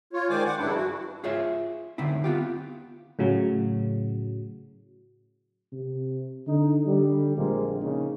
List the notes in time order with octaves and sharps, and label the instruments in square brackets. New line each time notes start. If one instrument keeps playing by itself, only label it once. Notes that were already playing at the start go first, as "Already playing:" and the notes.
[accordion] F4 C#5
D#3 G#3 C5 D5 G#5 D6
F#5 D6
G2 C#3 E3 D4 E4
F#4
[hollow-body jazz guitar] F4 G#4 C#5 E5
D3 D#3 C4 E4
B3 F4 G4
[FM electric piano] A2 C#3 F#3
[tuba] C3
[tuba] D3 [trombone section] D#4
[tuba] D3 [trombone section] G3
[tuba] A#1 [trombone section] G#3 A#3 C4
[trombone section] C#3 A#3 D#4